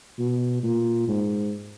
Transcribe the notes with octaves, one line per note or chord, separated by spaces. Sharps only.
B2
A#2
G#2